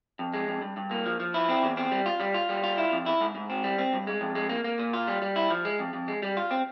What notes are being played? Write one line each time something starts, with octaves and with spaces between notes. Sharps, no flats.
F2
G#3
F2
G2
G2
A#3
F3
F3
E4
C4
E2
C4
G3
F4
G3
F4
G3
F4
E4
F2
E4
G#2
G#2
C4
G3
C4
G2
G#3
F2
G#3
A#3
A#3
A#2
F4
G3
G3
E4
F3
G#3
F2
F2
G#3
G3
F4
C4